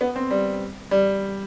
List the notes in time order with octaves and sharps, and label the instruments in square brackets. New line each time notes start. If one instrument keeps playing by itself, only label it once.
[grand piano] B3
C4
G3
G3